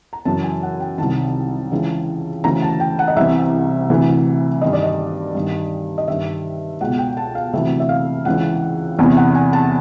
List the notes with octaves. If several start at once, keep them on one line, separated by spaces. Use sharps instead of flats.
A#5
F#2 C#3 E3 A5
G#5
F#5
G5
C2 C3 D#3 A5
C#2 C#3 E3
D2 C#3 E3 A#5
A5
G5
F#5
D#5
C2 C3 E3 E5
D2 C3 E3
G2 D#3 D#5
D5
D#5
G2 D#3
D#5
G2 D#3 E5
C#2 B2 F#5
G5
A5
F5
D2 C3 E3 E5
E5
F5
C#2 C#3 E3 F#5
E2 C3 E3 G#5
F#5
G#5
A5